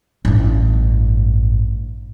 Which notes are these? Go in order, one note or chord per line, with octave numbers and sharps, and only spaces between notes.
A1 G2